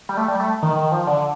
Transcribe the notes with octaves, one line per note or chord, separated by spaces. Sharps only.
G3
A3
G3
A3
D#3
D#3
F3
D3